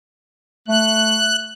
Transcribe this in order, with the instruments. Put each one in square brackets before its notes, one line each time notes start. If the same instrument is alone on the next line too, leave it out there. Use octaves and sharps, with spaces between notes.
[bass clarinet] A3 [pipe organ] F#6